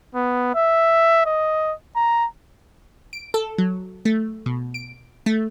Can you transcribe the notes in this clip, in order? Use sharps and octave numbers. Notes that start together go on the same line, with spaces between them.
B3
E5
D#5
A#5
D7
A4
F#3
A3
B2
D7
A3